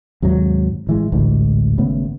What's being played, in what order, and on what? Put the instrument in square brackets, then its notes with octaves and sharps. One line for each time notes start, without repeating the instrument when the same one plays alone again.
[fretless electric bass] D#2 G#2 C3 F#3
A1 E3 G#3
A1 D2 G#2
G#1 C#3 A3 B3